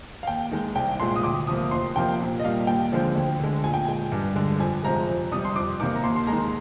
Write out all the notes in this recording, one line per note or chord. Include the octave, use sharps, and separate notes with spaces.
F5
D#2 G5
D#3 G#3
C2 G5
A#2 G#3 C6
D#6
D2 D6
C3 F3 A#3 D#6
F2 C6
C3 F3 A#3 G5
A#2
D#5
G3 A#3 F5
D#2 G5
D3 F3 G#3
D2
D3 G#3
A#2 G#5
G5
G#3 G#5
G2
D3 G#3
F2 G#5
C3 F3 G#3 A#5
F2
C3 G3 D#6
C6
F2 D6
C3 D#3 A#3 D6
A#5
D#2 C6
C6
D#3 G#3 A#5